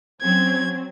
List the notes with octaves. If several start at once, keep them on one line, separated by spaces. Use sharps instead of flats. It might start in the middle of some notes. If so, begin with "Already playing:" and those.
F#3 C4 C#4 G#6